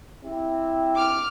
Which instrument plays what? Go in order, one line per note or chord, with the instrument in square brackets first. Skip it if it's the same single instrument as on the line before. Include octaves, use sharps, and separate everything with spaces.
[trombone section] C4 E4 G4
[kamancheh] D6 F6